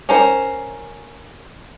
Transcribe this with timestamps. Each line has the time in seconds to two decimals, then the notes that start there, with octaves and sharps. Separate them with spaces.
0.09 C#4 A#4 C5